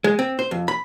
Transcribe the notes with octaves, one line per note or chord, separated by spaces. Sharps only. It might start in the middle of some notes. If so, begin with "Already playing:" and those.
G#3
C4
C5
F2
B5